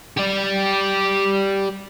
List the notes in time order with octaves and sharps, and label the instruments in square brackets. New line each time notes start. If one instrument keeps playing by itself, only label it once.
[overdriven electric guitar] G4 D5